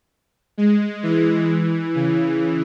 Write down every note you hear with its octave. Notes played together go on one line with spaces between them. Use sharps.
G#3
E3
C#3